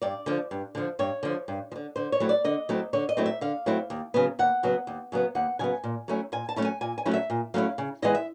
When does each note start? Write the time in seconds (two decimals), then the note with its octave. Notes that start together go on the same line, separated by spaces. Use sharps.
0.02 G2 D5
0.26 D3 F3
0.51 G2
0.75 D3 F3
0.99 G2 C#5
1.23 D3 F3
1.48 G2
1.72 F3
1.76 D3
1.96 D3 C5
2.12 C#5
2.20 F#3 A3 C4 E4
2.29 D5
2.44 D3 D#5
2.69 F#3 A3 C4 E4
2.93 D3 C#5
3.09 D#5
3.17 F#3 A3 C4 E4
3.26 E5
3.41 D3 F5
3.66 F#3 A3 C4 E4
3.90 D#2
4.14 C#3 F#3 B3
4.39 D#2 F#5
4.63 C#3 F#3 B3
4.87 D#2
5.12 C#3 F#3 B3
5.35 D#2 F#5
5.59 C#3 F#3 B3 G#5
5.84 A#2
6.08 F#3 A3 C#4 E4
6.32 A#2 G#5
6.49 A5
6.56 F#3 A3 C#4 E4
6.65 G#5
6.81 A#2 G#5
6.98 G#5
7.05 F#3 A3 C#4 E4
7.14 E5
7.30 A#2
7.54 F#3 A3 C#4 E4 F5
7.78 C#3
8.02 E3 G#3 B3 E4 D#5
8.15 E5